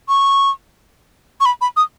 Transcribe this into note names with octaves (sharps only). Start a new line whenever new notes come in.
C#6
C#6
B5
B5
D#6